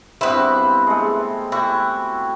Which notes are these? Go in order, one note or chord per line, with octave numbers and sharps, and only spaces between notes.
G2 B3 C4 E4 B4
G#3 A3
E4 F#4 G4